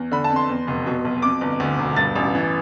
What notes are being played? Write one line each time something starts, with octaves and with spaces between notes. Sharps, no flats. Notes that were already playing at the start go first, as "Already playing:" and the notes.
Already playing: E2
D3 B5
A5
F2
C6
E2
F1
B2
B1
F2 D6
G1
D2
E1
G2 A6
A1
E3